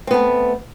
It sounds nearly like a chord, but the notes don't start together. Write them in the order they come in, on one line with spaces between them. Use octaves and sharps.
C4 B3 A3